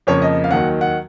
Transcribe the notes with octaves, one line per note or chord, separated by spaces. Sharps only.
F2 C#3 F3 A#3 C#5
D#5
F5
D#2 D#3 F#3 F#5
F#5